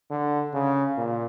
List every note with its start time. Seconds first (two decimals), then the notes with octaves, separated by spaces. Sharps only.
0.10 D3
0.53 C#3
0.97 A#2